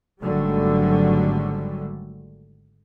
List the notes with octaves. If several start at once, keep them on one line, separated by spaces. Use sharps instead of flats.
G#1 G#2 D3 F#3 G3 A3